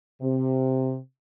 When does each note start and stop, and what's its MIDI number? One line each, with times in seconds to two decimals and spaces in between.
0.21 0.96 48